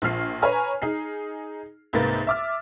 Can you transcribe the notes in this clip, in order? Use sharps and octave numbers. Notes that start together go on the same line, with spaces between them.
A#1 F3 F6 C7
B4 C#5 G#5 A#5 F6
D#4 G#4 C7
C2 G#2 A#3 B4 A6
E5 D6 F6